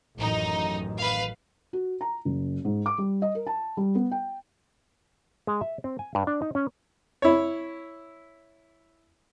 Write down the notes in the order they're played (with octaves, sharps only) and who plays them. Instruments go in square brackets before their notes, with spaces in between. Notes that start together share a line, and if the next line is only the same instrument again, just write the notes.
[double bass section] A1 F#2 D#3 [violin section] D#4
[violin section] B4 F5
[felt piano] F#4
A#5
F#1
G#2
D6
G3
D#5
A#4
A5
G3
B3
G5
[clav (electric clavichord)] G#3
E5
C4
G#5
G2
D4
D#4
C#4
[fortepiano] E4 C#5